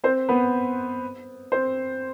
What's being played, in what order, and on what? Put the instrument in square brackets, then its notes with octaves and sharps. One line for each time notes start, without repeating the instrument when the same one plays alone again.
[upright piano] C4 C5
B3 B4
C4 C5